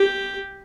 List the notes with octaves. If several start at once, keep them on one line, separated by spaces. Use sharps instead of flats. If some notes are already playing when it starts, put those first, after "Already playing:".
Already playing: G4